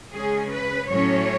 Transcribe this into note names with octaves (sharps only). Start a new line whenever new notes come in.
C#3 G#3 C#4 G#4
B4
A2 F#3 A3 C#4 C#5